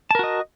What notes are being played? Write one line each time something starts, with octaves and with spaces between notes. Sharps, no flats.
F#4 A#4 D#5 A5